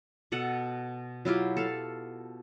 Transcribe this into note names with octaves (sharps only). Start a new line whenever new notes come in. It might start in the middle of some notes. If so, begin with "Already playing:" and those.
B2 A4 F#5
F#3 E4 F4 G4
A4 F5